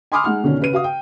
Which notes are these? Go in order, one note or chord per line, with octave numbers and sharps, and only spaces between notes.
G#5 B5 C6 D6 D#6 F6
G#3 D#4 F#5 F6
D2 B2 D3 D#3 C#4
C#3 B4 D#7
F#4 F5 D#6
G5